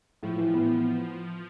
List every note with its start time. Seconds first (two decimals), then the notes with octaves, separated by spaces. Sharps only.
0.23 A2 F3
0.38 E3
0.54 B3